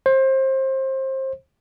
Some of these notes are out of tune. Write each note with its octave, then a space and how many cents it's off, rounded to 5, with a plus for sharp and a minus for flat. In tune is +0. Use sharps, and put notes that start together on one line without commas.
C5 +25